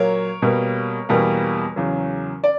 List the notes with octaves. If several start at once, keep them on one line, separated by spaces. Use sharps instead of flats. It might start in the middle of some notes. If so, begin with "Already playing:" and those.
Already playing: A#2 F#3 A#3 A#4 C#5
B2 G3 A#3
E2 B2 G3 A#3
E2 C#3 F#3
D5